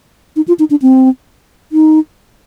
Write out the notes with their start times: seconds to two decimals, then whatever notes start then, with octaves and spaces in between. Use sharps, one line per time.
0.36 D#4
0.48 F4
0.59 D#4
0.70 D4
0.82 C4
1.72 D#4